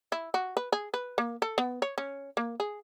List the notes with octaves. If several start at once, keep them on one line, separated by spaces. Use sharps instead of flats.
E4
F#4
B4
G#4
B4
A#3
A4
B3
C#5
C#4
A#3
G#4